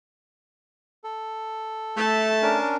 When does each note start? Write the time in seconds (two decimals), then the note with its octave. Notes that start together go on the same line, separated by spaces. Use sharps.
1.04 A4
1.97 A3 A5
2.42 C#4 D4 A#4